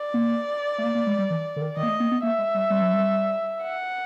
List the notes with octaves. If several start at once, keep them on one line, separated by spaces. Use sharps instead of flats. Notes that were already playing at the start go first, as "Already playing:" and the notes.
Already playing: D5
A#3
A3
A#3
A#3
G#3
G3
E3
D3
D#3
D#3 D#5
A#3
A3
A#3
B3
A#3 E5
G#3
G3
G3
F#3
G3
F#5